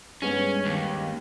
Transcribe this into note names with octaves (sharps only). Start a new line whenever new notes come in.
G2 G#3 B3 C#4
D#2